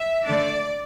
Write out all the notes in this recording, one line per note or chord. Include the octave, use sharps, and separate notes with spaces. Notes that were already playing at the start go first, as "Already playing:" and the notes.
Already playing: E5
D3 A3 D4 D5